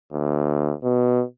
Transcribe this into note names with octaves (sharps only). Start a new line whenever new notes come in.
D2
B2